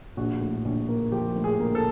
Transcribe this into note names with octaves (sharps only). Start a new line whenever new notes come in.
A#1 F#4
A2
A#1
A#3
F3 G4
A2
G#4
A#3
A4